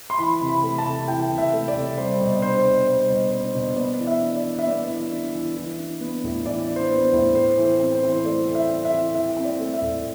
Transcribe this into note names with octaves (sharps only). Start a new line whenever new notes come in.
C6
E3 B5
C3
B5
A3
A5
C3
E3 G5
C3
E5
A3
D5
C3
G3 C5
B2
D5
D4 C5
B2
G3 C5
B2
D4 C5
B2
B3 D5
E3
E5
D4
D5
E3
E5
B3 D5
E3
D4
E3
E3
D4
B3
A2
E3 D5
D4
C5
B3
C5
A2
A3 C5
E3
C5
C4
C5
E3
C5
A3 D5
E3
E5
C4
E5
E3
E3 E5
C4
D5
A3
E5
A2